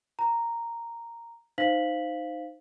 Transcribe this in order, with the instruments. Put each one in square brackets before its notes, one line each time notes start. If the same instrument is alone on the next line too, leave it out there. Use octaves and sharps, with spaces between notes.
[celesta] A#5
D#4 C5 F5 B6 F#7